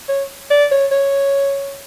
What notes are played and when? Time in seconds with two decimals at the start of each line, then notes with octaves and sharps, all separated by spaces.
0.09 C#5
0.50 D5
0.71 C#5
0.92 C#5